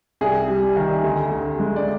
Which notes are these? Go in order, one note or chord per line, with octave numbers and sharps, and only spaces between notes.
C2 G#4
G3
D#3
D2
D2
G#3
D5